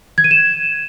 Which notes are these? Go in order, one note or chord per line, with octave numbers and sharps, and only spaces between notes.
G#6
D#7
E7